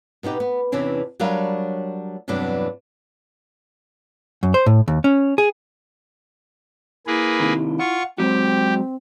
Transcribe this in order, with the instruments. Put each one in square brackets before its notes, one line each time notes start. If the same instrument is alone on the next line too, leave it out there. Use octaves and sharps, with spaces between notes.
[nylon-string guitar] B2 B3 D#4 G4
B3
E2 C3 E3 C#4 D4
F#3 G3 D4 A#4 C#5 F5
E2 G2 C3 F#3 B3 D4
[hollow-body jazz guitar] F#2
C5
A2
D#2
C#4
G#4
[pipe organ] A#3 G#4 B4 [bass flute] E4
[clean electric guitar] D#2 C3 D#3
[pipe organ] F4 C#6 [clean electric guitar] F#5
[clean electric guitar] F#3 G#3 F#4 [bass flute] C4 [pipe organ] G4